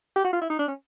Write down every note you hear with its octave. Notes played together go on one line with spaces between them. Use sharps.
G4
F#4
F4
E4
D#4
D4
C#4